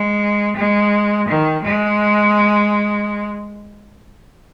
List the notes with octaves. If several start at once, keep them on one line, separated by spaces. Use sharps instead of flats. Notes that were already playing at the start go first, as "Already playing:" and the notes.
Already playing: G#3
G#3
D#3
G#3